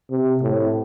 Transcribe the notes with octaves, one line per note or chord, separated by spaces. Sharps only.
C3
A2